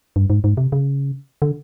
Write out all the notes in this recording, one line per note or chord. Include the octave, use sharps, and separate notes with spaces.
G2
G#2
G#2
C3
C#3
D3